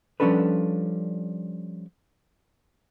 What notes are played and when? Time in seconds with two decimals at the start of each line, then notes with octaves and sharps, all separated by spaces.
0.20 F3 G3 C#4 D4 A4 B4